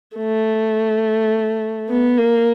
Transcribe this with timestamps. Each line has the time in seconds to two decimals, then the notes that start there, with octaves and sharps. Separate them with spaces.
0.17 A3
1.89 B3
2.18 A#3